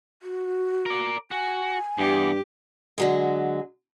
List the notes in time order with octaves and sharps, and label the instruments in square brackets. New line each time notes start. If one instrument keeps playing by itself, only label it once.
[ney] F#4
[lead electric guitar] A#4 D5
[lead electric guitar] F#4 [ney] G#5
[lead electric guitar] E2 [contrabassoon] G2 [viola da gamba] G4
[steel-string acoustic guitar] D3 F#3 G#3